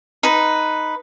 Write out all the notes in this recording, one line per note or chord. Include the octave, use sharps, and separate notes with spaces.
D#4 B4